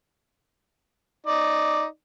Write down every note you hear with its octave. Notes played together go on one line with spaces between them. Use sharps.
D#4 D5